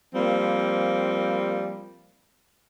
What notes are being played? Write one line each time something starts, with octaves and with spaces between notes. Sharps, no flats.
F3 G3 A#3 C4